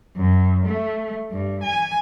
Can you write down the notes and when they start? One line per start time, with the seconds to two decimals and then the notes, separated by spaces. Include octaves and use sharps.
0.16 F#2
0.66 A3
1.32 G2
1.64 G#5